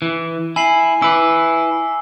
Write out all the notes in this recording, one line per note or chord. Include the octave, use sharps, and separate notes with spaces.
E3
E4 G#5 C7 F#7
E4 B4 D6 E6